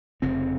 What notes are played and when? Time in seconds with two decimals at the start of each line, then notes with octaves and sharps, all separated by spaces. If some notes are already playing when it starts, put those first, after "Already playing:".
0.22 F1 F2 C#3 C4